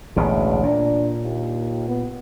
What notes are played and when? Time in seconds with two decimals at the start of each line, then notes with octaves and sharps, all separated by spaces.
0.16 A1 D2 B2 G#3
0.63 A#2 D4
1.23 D#2
1.88 B3